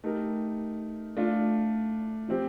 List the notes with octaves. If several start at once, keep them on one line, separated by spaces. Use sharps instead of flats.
A3 D#4 G4 A#4
A3 D4 F4
F3 C4 G4